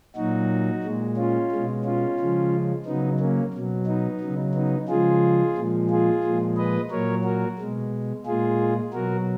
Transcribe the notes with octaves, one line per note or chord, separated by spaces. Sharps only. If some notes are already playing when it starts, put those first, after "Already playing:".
A#2 F#3 D#4 F#4
A#2 G#3
C#4 F4
B2 G#3
C#4 F4
C#3 F3 G#3
C#3 F#3 B3 D#4
A#3 C#4
B2 F#3
B3 D#4
C#3 F#3
B3 D#4
C#3 F3 G#3 F4 G#4
A#2 F3 G#3
F4 G#4
A#2 F3 G#3
B4 D#5
A#2 F#3 A#4 C#5
F#4 A#4
B2 G#3
A#2 G#3 F4 G#4
B2 F#3 F#4 A#4